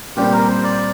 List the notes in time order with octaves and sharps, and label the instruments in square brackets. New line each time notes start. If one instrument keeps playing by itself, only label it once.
[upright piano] A#2 G3 C4 [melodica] G4
[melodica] A#4
C5
D5